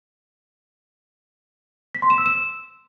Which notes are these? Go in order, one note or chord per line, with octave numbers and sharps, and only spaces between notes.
B6
C6
E7
E6
E7